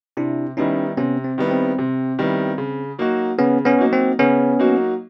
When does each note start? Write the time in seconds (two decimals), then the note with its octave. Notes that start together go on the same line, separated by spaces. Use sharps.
0.17 C3 D4 E4
0.57 D#3 G3 B3 C#4 D#4 E4
0.97 C3 B3 C#4
1.24 C4
1.38 D#3 G3 B3 E4
1.51 C4
1.79 C3
2.19 D#3 G3 B3 E4
2.58 C#3
2.98 F#3 A#3 D#4 F#4
3.38 C#3 B3 C#4
3.65 B3 C#4
3.78 F#3 A#3 D#4 F#4
3.93 C4
4.19 C#3 B3 C#4
4.59 F#3 A#3 D#4 F#4